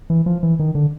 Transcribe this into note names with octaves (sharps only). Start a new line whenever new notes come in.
E3
F3
E3
D#3
D3